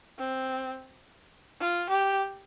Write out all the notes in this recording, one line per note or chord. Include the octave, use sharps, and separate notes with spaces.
C4
F4
G4